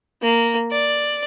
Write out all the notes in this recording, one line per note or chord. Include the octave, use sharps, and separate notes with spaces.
A#3
D5